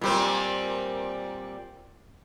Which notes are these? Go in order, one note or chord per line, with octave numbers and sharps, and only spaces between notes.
A#2 G3 C4